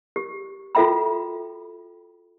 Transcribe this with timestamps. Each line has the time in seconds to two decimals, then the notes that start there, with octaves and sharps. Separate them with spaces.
0.16 G4
0.75 F4 F#4 A4 E5 G5 B5